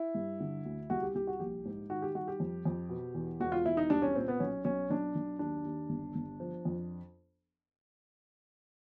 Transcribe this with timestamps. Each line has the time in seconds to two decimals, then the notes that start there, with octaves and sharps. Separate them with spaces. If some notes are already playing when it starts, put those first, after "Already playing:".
Already playing: E4
0.15 G2
0.40 D3
0.65 D2
0.90 C2 F#4
1.03 G4
1.15 C2 G4
1.27 F#4
1.40 A#1 G4
1.65 G#2
1.90 D#3 F#4
2.02 G4
2.15 G3 F#4
2.28 G4
2.40 F2
2.65 F2
2.89 B2
3.14 E2
3.40 E1 F#4
3.52 F4
3.65 E1 E4
3.77 D#4
3.90 C2 D4
4.02 C#4
4.15 A#2 C4
4.28 B3
4.40 B1 C#4
4.65 B1 C#4
4.90 B1 D4
5.15 B1
5.39 D#2 D4
5.65 D#2
5.90 G1
6.15 G1
6.40 F3
6.65 F2